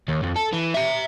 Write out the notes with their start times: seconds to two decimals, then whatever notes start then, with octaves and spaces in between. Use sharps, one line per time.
0.08 D#2
0.23 F2
0.36 A4
0.53 E3
0.74 E5 A#5